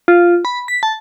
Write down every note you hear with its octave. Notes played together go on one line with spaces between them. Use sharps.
F4
B5
B6
A5